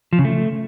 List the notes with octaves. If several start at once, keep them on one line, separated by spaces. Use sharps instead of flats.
F3
C#3
A3